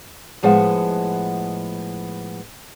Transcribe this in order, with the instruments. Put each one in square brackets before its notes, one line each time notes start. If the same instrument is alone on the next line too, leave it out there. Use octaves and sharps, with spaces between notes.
[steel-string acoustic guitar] A2 F3 G#3 B3 F#5 A5